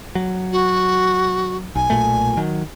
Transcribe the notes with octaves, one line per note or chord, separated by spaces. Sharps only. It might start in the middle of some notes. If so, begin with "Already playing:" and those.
F#3
F#4
B1 G#5
B1 A#2 A3
D#3 F#3